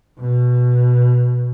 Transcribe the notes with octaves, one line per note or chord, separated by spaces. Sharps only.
B2